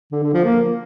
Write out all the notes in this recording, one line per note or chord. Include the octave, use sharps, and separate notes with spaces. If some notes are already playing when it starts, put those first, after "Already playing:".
D3
D3
F3
A#3